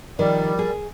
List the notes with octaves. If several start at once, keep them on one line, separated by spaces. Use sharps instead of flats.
D#3 F3 G3 A#4
G#4